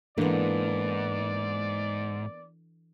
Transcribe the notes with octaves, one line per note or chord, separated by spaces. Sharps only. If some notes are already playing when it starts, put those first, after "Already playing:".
G#2 E3 A#3 B3 D4 A4 D5